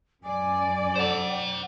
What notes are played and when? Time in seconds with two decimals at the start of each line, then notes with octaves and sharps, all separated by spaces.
0.23 F#2 D5 G#5
0.96 A4 C5 F#5
1.28 G5